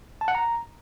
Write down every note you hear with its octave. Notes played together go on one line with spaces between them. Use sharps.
A5
F#5
A#5